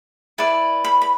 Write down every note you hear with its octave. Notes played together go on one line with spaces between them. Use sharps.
E4 B4 D5 A5
B5
B5